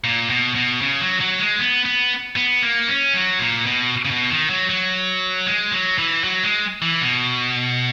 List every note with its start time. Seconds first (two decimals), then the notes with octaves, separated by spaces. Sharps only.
0.04 A#2
0.30 B2
0.55 B2
0.81 C#3
1.01 F#3
1.20 F#3
1.39 G#3
1.59 B3
1.85 B3
2.37 B3
2.62 A#3
2.88 C#4
3.14 F#3
3.40 A#2
3.66 B2
4.05 C#3
4.11 B2
4.30 D#3
4.50 F#3
4.69 F#3
5.47 G#3
5.72 F#3
5.98 E3
6.24 F#3
6.43 G#3
6.82 E3
7.01 B2